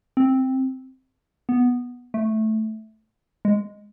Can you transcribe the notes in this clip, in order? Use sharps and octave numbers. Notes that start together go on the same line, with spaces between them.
C4
B3
A3
G#3